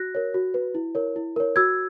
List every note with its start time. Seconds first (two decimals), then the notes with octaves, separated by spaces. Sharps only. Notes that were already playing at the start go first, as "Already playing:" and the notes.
Already playing: F#4 F#6 A#6
0.15 A#4 C#5
0.34 F#4
0.54 B4
0.75 E4
0.95 A#4 C#5
1.16 E4
1.36 A#4 C#5
1.56 F#4 E6 G#6